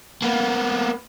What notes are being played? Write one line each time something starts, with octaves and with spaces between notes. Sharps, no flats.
A#3 B3